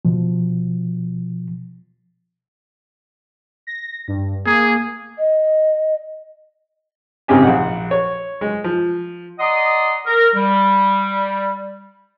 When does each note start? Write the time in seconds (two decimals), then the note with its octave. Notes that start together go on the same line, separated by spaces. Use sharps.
0.05 B2 F3
3.67 A#6
4.08 G2
4.46 A#3 G#4
5.18 D#5
7.28 G#1 C#3 C4 G4 G#5
7.43 A#1 F#5
7.91 C#5
8.41 G#3
8.64 F3
9.39 D5 D#5 F#5 A#5 C6 D#6
10.06 A#4
10.35 G3